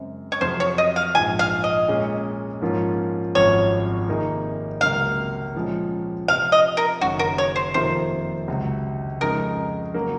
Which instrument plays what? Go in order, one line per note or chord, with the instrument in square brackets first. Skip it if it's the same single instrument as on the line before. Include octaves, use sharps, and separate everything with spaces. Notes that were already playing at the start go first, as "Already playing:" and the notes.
Already playing: [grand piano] F#2 C#3 G#3 C4
[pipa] C#5
[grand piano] F2 C3 F#3 [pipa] C5
[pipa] C#5
D#5
F5
[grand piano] A#1 G#2 F3 [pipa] G#5
[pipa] F5
D#5
[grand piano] A#2 G#3 C#4 G#4
G#2 F3 A#3 C#4 F4
[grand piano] G#1 F#2 F3 C4 F#4 [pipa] C#5
[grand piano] C3 D#3 A#3 D#4 G#4
[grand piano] C#2 C3 F#3 A#3 [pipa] F5
[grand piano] A#2 F3 G#3 C#4
[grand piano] C3 F3 C4 F4 [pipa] F5
[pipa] D#5
A#4
[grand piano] F#1 F#2 D#3 F#3 C#4 [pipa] F#4
[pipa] A#4
C#5
C5
[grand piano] F2 C3 D#3 A#3 F4 [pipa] C5
[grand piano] C#2 C3 F#3
[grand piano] F2 C#3 G#3 D#4 [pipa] A#4
[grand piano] C#3 F#3 A#3